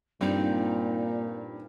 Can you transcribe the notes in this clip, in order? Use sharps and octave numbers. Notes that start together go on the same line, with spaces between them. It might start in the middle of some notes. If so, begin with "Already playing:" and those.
G2 A#2 C4 D#4